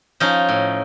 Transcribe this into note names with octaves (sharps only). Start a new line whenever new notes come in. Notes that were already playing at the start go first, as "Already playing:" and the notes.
F3 C#4 D#4
A2